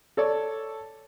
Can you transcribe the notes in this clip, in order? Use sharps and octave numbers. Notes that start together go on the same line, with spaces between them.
A4 C#5 D5